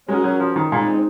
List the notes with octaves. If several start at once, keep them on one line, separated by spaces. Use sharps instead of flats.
G#3 C#4 F#4 A#4
F#3
F3
D#3
A#2 G#3 C4 D#4